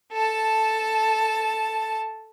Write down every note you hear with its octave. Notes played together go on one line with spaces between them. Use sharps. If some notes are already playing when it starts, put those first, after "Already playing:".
A4 A5